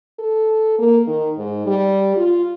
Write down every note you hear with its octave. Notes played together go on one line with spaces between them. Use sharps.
A4
A#3
D#3
G#2
G3
F4